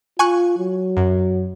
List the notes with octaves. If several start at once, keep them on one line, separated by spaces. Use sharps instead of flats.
F4 G#5 C#6 F#6
F#3
F#2